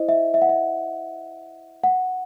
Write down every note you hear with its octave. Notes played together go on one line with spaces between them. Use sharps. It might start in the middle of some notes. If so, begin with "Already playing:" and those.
Already playing: E4 C5 D#5
E5
E5
F#5
E5
F#5